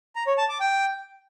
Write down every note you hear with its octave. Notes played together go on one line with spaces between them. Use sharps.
A#5
C#5
A5
D6
G5